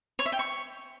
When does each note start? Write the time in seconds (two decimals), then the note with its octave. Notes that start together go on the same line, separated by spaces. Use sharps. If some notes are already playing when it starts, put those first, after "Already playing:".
0.19 C#5
0.26 E5
0.32 G5
0.39 C#6